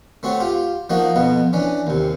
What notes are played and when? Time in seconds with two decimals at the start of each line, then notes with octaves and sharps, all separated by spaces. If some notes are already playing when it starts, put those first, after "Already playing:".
0.23 A3 C4 F#4 C#5
0.40 F4 G4
0.90 F3 A#3 D#4 F#4
1.16 F2 B2 B3
1.53 E3 C#4 D4
1.87 D#2 C3